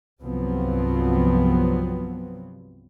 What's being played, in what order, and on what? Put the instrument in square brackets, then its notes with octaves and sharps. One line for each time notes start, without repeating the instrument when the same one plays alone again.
[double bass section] C2 G2 F3 F#3 B3 C4